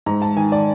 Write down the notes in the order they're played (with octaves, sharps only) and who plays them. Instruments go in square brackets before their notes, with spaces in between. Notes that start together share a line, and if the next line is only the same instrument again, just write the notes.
[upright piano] G#2 A#5
A5
D#3 G#5
D5